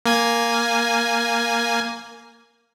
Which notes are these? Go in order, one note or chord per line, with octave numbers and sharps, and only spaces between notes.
A#3 G#5